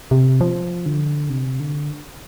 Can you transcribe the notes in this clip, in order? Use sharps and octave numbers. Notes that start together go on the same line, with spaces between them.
C3
F3
D3
C3
D3